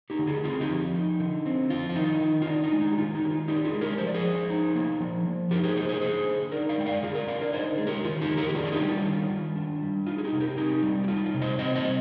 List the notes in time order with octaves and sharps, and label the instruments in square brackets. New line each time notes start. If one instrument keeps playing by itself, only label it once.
[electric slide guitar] D#4 G4
D3
F4 G#4
C4 F4 G#4
D#4 G4
F3
D#4
D3
C4
F3 F4
F4
D#3 D#4
D#3
F4
D4 D#4
D#4
G#3
D#4
G4
D#3 F4
D#4
D#3 G4
F4
D4 D#4 G4
F4 G#4
G#3
G4 A#4
F3 C5
D5
G#4 C5
F3
D#4
A#3
F3
F3
D#4 G4 A#4
G#4 C5
A#3 G#4 C5
G#4 C5
D3 G#4 C5
D3
D#4 A#4 D5
D5 F5
G#3 G5
D5 F5
D3 F4 G#4
A#4 D5
D3 D5 F5
A#4 D5
D#4 C5 D#5
G#3 G#4
G4 A#4
D#3 F4
D#4 G4
D#3
G4 A#4
G4
D4 F4 G#4
G#4
D#4 G4
G3
F4
D#3 F4
D#3
D4
G3
D#4 F4
G#4
D#4 G4
C3 G#4
G4 A#4
C4 D#4 G4
G3
G4
D#4 F4
F4
C3
C5 D#5
C4 C5 D#5
C5 D#5
G3